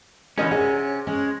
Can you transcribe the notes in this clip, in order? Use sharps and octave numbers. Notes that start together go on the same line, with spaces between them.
A#2 D3 E3 C#4 A#4 D#5
C3 G#4 F#5
G#3 C#4